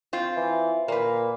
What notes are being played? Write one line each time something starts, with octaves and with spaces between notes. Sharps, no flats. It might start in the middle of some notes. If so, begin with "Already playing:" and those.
C4 F4
E3
A#2 A#3 B4